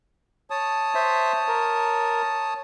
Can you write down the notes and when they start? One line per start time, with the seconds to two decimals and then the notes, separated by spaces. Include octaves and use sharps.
0.50 C#5 A5 D#6
0.95 C5 E5
1.48 A#4